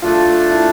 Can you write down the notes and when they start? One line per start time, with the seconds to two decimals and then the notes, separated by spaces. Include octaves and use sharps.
0.02 A3 D4 F4 A4
0.51 E4